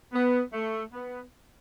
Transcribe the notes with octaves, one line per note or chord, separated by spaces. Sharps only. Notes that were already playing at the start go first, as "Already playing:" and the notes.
B3
A3
B3